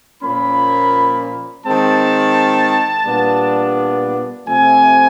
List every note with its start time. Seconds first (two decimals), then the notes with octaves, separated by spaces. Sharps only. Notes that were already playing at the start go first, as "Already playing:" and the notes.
0.22 A#2 F3 A#3 C#4 B5
1.63 D#3 G#3 C4 A5
3.05 A#2 G3 B3 D4
4.47 C3 F3 A3 C4 G#5